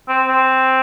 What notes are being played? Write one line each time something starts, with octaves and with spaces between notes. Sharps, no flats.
C4
C4